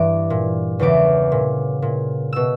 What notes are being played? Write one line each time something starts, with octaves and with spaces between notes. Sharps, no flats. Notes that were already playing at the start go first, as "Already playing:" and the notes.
Already playing: G2 E3 D6
A#2
E2 C#3 E3 D6
A#2
A#2
B2 E6